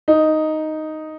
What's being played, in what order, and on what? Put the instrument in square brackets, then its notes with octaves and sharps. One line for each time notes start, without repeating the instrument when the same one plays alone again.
[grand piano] D#4